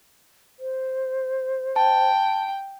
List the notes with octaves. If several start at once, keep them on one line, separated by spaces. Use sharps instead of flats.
C5
G5 A5